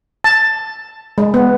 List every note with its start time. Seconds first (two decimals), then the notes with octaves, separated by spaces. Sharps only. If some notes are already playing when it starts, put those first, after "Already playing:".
0.24 A5
1.18 G#3
1.34 B3